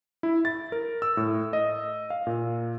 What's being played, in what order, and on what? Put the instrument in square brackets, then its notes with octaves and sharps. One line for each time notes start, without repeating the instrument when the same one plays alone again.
[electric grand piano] E4
A6
A#4
E6
A2
D#5
F5
A#2